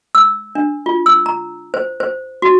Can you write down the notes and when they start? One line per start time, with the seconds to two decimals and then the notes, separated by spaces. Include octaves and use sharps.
0.15 E6
0.55 D4
0.86 F4
1.06 E6
1.26 A#5
1.74 C5
2.00 C5
2.42 F#4